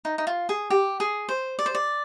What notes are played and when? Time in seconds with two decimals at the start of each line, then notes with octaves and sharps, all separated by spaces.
0.05 D#4
0.18 D#4
0.27 F4
0.49 G#4
0.70 G4
1.00 G#4
1.29 C5
1.59 D5
1.66 C5
1.75 D5